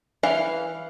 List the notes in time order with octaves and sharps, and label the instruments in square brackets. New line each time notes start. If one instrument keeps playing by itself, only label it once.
[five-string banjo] E3 F5